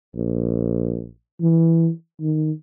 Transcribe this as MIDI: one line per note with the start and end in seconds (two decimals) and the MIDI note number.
0.15 1.06 34
1.41 1.89 52
2.20 2.51 51